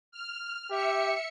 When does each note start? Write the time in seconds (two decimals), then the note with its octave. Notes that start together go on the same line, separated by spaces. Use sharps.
0.12 F6
0.70 G4 E5 C#7